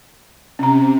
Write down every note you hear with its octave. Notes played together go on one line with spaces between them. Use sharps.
C3 C#4 A#5